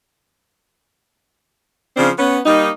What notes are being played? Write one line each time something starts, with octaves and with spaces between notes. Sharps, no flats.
C#3 F3 C4 D4
B3 C#4
G3 A#3 D#4